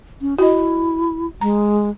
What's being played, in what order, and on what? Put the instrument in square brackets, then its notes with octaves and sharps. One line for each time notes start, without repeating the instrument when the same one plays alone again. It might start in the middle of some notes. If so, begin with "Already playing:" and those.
[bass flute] C#4
[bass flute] E4 [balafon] F#4 D#5
[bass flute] G#3 [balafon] A#5